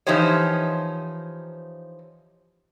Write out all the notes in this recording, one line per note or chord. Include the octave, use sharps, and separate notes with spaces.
E3 F3 D#4 G4 C5 C#5